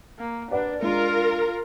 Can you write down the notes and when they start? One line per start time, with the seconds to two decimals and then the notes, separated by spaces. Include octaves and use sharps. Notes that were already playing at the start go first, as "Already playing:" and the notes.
0.19 A#3
0.51 D4 B4 D5 F#5
0.82 G#3 D4 F4 A#4